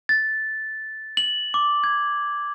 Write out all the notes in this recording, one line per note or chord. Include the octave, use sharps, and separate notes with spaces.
A6
F#7
D6
G#6